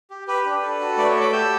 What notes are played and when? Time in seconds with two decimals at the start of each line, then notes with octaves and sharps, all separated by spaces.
0.10 G4
0.28 G4 B4
0.45 D4
0.62 A4
0.80 F#4
0.97 A3 B4 D5
1.09 C#5 E5
1.15 A4
1.20 B5 D6
1.32 G4 E6 G6